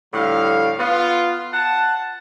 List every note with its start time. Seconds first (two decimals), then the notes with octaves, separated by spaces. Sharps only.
0.14 A2 D3 F3 G3 F5
0.79 B3 F4
1.53 F#5 A5